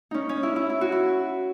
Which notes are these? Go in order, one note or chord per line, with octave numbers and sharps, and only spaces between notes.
C#4 D#4
C#4
E4
E4
E4
F#4
E4